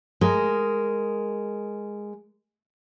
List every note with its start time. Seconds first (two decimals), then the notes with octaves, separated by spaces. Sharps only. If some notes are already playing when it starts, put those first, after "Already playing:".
0.21 G#3 A#4